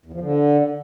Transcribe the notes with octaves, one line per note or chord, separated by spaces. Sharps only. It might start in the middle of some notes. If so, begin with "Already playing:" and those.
E2
F3
D3